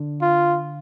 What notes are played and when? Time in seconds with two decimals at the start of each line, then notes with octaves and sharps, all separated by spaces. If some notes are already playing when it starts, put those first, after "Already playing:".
Already playing: D3
0.22 F4